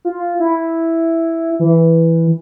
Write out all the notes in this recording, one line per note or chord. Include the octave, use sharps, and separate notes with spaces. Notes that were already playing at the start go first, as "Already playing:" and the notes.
F4
E4
E3